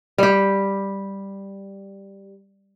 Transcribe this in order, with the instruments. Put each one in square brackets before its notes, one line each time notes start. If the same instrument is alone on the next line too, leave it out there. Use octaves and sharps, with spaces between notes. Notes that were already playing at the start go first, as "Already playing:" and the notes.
[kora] G3 G4